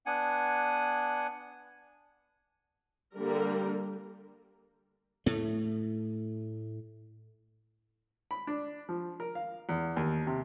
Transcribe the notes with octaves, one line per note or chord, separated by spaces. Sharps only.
B3 D4 F#5 G#5
D3 G3 A#3 A#4
A2 A3
B5
D4
F3
A#4
F5
E2
D#2
C3